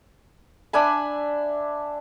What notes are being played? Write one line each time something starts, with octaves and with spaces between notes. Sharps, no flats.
D4 E5 G#5 B5